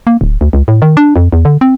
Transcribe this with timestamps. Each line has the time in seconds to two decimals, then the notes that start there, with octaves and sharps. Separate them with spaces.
0.07 A#3
0.21 D1
0.41 D2
0.53 C#2
0.68 A2
0.82 D#3
0.97 D4
1.16 F2
1.32 E2
1.45 D3
1.61 C4